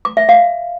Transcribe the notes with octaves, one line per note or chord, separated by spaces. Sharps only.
D6
E5
F5